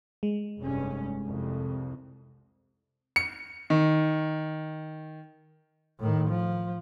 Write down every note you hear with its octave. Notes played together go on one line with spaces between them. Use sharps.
G#3
F1 G2 C#4
C2 F2
C#7
D#3
A2 D#3
F3